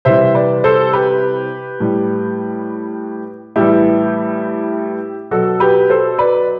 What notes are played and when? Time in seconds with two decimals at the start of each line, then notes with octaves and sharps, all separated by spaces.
0.05 C3 E3 G3 C5 E5
0.35 B4 D5
0.64 A4 C5
0.93 G4 B4
1.80 A2 G3
3.56 A2 E3 G3 E4 G4
5.31 B2 F#3 F#4 A4
5.60 G4 B4
5.89 A4 C5
6.18 B4 D5